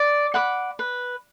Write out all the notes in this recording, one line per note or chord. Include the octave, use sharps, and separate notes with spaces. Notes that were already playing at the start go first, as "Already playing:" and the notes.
Already playing: D5
F#5 B5 D6
B4